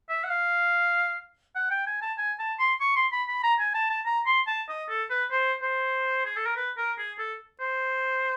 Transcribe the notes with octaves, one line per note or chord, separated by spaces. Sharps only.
E5
F#5
F5
F#5
G5
G#5
A5
G#5
A5
C6
C#6
C6
B5
B5
A#5
G#5
A5
A5
A#5
C6
A5
D#5
A4
B4
C5
C5
G#4
A4
A#4
B4
A#4
G#4
A4
C5